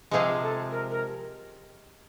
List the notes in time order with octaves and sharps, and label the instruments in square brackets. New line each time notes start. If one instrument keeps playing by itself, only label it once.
[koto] C3 F3 G#3 [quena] G#4
[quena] A4
A#4
A#4